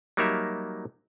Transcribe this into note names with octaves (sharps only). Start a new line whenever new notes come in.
F#3 G3 A#3 D#4 A#4 E5